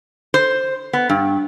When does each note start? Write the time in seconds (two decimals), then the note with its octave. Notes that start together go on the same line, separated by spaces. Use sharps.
0.34 C5
0.93 B3
1.10 G2